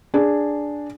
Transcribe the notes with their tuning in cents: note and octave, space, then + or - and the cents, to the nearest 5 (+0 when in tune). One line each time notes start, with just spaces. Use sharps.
D4 +0 G#4 -5